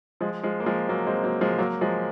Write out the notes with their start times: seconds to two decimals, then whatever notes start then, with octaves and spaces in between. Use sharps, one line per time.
0.21 F3 G#3
0.43 F3 G#3
0.60 A#3
0.66 F3 G#3
0.89 F#3 A#3
1.07 G#3 C4
1.24 F#3 A#3
1.41 F3 G#3
1.59 F#3 A#3
1.81 F3 G#3